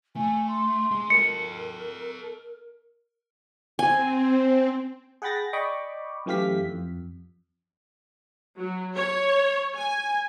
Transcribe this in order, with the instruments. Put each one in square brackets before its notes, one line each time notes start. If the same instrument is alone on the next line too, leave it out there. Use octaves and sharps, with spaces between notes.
[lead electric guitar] A3 [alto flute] G#5
[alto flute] C6
[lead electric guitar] G#3
[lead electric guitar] A4 D#5 [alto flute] A#4 [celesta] C#7
[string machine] C4 [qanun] G#5
[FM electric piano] G#4 F#5 G5 B5 A6 A#6
D5 D#5 G5 B5 C#6 D6
F#2 E3 A3 G4 F5 B6
F2
[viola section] F#3
C#5
G#5